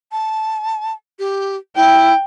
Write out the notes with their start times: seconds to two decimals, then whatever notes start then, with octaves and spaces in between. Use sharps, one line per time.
0.12 A5
1.19 G4
1.76 E4 G5